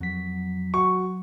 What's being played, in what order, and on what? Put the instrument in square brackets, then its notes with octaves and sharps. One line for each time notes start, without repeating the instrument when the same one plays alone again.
[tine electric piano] F2 B6 [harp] F#3
[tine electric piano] F#4 [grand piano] C#6